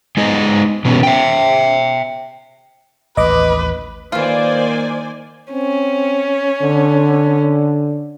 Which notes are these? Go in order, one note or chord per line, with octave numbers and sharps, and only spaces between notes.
G#3 B3 D#4 G#4 D#5
B2 E3 B3 C#4
E5 G5
A1 D#2 B4 D#5 D6
D#3 E3 A#3 F4 C5 D5 G#5
C4 C#4
D3